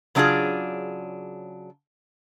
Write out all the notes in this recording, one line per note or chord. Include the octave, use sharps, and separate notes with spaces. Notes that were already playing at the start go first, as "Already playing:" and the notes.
C#3 F#3 D4 D#4 F4 G#4